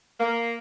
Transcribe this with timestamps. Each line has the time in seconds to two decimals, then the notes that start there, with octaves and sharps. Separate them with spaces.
0.20 A#3